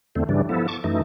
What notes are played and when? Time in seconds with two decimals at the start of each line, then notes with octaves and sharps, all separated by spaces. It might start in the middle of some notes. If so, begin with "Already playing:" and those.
0.15 E2 D3 A3 C4
0.29 G2 C#3 E3 G3 D4
0.49 F3 B3 E4 A4
0.68 A5 C#6 D6
0.84 F#2 E3 A3 D#4